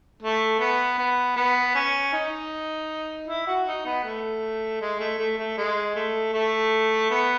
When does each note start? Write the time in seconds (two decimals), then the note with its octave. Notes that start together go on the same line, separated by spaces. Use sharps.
0.23 A3
0.60 B3
0.98 B3
1.36 B3
1.75 C#4
2.13 D#4
3.28 E4
3.47 F#4
3.66 D#4
3.85 B3
4.04 A3
4.81 G#3
4.99 A3
5.18 A3
5.38 A3
5.57 G#3
5.95 A3
6.33 A3
7.10 B3